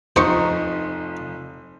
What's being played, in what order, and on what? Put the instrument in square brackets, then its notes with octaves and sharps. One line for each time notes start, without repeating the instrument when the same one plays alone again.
[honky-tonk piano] F1 F3 [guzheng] D#4 [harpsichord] C5 C#6